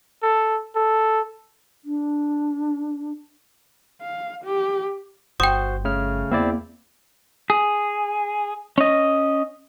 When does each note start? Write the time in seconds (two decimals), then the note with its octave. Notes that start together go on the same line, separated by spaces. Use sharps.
0.23 A4
0.75 A4
1.84 D4
4.01 F5
4.43 G4
5.40 G1 F#4 C5 G5 D#6
5.85 C#3 A3 F6
6.31 E2 A#3 C4 E4 D5
7.50 G#4
8.78 C#4 D#5